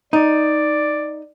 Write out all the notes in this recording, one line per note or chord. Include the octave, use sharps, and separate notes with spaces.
D#4 D5